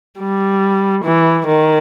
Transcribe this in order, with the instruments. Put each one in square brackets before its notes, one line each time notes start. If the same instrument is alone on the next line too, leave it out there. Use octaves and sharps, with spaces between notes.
[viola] G3
E3
D#3